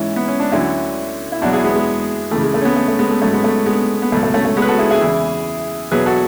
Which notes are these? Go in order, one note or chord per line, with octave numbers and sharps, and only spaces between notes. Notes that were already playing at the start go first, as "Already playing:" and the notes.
Already playing: G#2 E3 C#4 E4
B3
C#4
D4
D2 D3 F#3 C#4 E4
E4
E2 B2 F#3 D4 F#4
E4 G#4
G#3 B3
G#3
C#2 C#3 E3 A3
G#3
A3
C#4
G#3 B3
A3
A3
G#3 B3
A3
G#2 F#3 A3 C#4
G#3 B3
A3
G#3 B3
B3
C#2 B2 F#3 A3
A3
A3 C#4
A3
G#3 B3
B4
F#4 A4
E4 G#4
E4 G#4
E2 C#3 E3
E2 B2 F#3 G#4 B4
F#4 A4